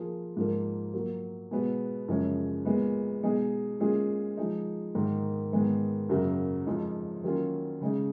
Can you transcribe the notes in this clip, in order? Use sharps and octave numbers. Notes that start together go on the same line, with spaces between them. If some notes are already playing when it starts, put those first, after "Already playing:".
Already playing: F3 A#3 F4 G#4
G#2 F3 A#3
A#2 F#3 A#3
B2 G#3 B3 F#4
F#2 C#3 F3 G#3 C#4
A#2 G#3 B3
B2 G#3 D#4 G#4
A#2 G#3 C#4 F4 G#4
F3 G#3 D#4
G#2 D#3 A#3
G#2 D#3 G#3 B3
F#2 C#3 F#3 A#3
F2 F3 G#3 D#4
D#3 F#3 A#3 C#4 F4
C#3 G#3 D#4